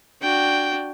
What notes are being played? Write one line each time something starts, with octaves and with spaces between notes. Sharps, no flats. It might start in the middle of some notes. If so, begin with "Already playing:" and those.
D4 F#4 G5